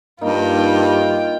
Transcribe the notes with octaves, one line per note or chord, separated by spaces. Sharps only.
G2 A#3 D#4 F4 G5